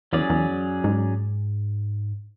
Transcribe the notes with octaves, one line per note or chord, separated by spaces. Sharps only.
E2 F#3 C#4 G#4 D5
E2
F#2
G#2